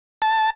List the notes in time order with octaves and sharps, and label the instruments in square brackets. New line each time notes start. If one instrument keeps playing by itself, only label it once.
[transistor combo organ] A5